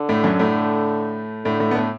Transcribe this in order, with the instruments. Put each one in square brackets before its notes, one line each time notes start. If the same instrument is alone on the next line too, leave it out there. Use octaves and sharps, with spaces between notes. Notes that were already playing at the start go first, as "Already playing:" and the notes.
Already playing: [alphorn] D3
[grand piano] A2 A3
F#2 F#3
A2 A3
[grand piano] A2 A3 [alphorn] D3
[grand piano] A2 A3
B3
A2 A3